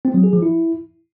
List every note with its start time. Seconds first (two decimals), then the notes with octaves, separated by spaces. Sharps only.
0.05 C4
0.14 F#3
0.24 G#4
0.33 F3
0.42 E4